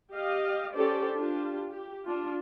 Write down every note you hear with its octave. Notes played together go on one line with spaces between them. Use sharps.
G4 D#5 F5
C#4 G4 A4 C5 D5
D4 F4 G4
G4
D4 F4